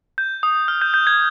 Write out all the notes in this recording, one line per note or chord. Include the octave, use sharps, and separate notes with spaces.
G6
D#6
F6
G6
G6
G#6